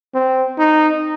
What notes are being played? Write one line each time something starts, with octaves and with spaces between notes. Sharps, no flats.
C4
D#4